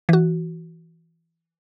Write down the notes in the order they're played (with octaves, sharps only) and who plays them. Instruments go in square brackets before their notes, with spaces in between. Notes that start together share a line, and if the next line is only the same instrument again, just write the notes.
[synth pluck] E3 F#4